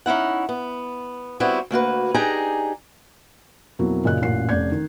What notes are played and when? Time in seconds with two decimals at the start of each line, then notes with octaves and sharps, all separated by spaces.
0.06 C#4 D#4 E4 F#5
0.49 B3
1.40 G3 B3 C4 E4 F#4
1.71 D2 A#3 F#4 B4
2.14 D4 D#4 G4 G#4 G#5 A#5
3.79 F2 B2 F#3 A#3 E4
4.04 F#2 A#2 C#3 D#5 F#6
4.21 A1 F#2 A#2 C7
4.49 F1 C#4 D5 G6 G#6
4.72 D#3